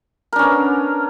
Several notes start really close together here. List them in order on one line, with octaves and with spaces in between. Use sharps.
A#4 D4 C#4 B3